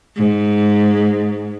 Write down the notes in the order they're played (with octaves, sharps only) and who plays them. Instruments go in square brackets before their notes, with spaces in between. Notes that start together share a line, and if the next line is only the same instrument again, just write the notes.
[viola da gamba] G#2